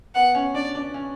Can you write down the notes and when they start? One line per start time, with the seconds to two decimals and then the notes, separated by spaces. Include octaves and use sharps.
0.15 B3 F#5
0.35 C#4
0.54 D4 D5
0.75 D4
0.94 C#4